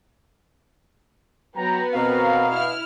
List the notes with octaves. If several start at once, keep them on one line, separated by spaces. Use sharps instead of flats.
F#3 B3 F#4 G5 A#5
B2 C4 A#4 F5 A#5
E4 F6